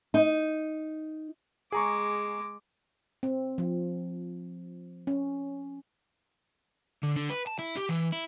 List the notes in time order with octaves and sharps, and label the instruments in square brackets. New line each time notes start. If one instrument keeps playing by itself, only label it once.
[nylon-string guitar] D#4
[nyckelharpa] G#3 D6 [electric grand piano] G#4 A#5 C#6
[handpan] C4
F3
C#4
[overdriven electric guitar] D3
D3
B4
A5
E4
G4
E3
E4